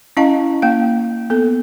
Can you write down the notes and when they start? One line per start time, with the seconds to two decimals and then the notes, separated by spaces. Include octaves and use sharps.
0.17 C#4 E4 D#5 F5 A5
0.62 A#3 F5
1.30 B3 A4